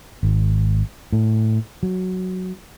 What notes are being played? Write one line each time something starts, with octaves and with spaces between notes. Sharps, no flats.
G#1
A2
F#3